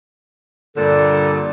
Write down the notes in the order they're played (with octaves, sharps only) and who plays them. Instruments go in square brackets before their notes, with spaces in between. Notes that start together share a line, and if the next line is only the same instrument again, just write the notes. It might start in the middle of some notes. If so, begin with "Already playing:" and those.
[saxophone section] G2 A#2 D3 [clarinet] A4